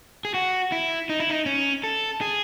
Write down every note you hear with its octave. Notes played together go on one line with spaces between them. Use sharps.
G#4
F#4
E4
D#4
E4
D#4
C#4
A4
G#4